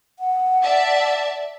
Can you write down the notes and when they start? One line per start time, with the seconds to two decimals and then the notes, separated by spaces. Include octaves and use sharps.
0.19 F#5
0.62 D5 E5 A5